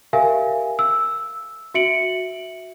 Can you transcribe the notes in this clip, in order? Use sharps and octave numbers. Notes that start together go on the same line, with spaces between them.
G4 A#4 E5 F5 G#5
E6
F#4 E5 C#7 D7 F#7